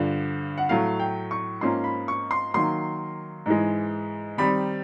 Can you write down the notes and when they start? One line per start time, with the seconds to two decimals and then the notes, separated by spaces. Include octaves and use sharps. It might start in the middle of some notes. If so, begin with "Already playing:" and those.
Already playing: G2 D3 F3
0.58 F#5
0.69 A2 F#3 A3 F5
1.00 G5
1.31 C#6
1.61 G#2 F3 A#3 C#4 C6
1.84 B5
2.08 C#6
2.31 C6
2.54 D#3 F#3 A#3 C6
3.46 G#2 E3 G#3
4.38 D#3 G3 C4 D#4 B5